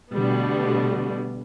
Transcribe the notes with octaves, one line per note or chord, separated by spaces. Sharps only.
B2 D3 G3 A3 B3